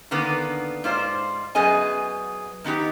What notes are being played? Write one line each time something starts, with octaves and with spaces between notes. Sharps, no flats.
D3 D#3 A#3 B3
G#2 F4 C5 D5
F#2 B3 G#4 D#5 G#5
D#3 B3 D#4 G4